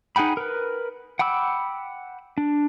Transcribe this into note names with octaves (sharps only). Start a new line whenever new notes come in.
D#4 G#4 F#5 G5 B5
A#4 B4
F#5 G5 B5 D6 E6
D4